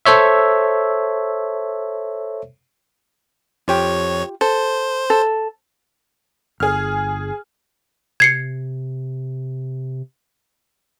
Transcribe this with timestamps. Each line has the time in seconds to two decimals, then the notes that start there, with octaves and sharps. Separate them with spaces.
0.06 A4 C5 C#5 E5
3.68 F2 F4 G4 C#5
4.41 A4 C5
5.10 A4
6.60 G1 G#4 F6
8.20 C3 G#6 C7 C#7